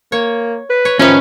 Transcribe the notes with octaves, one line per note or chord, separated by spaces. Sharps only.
A#3 C#5
B4
C#5
A2 D#3 F3 C#4 B4